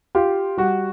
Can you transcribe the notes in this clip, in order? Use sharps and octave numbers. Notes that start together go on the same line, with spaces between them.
F4 G4
G3 F#4